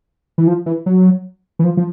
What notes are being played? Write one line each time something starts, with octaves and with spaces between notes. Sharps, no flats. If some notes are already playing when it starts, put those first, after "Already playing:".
E3
F3
E3
F#3
E3
F3
F3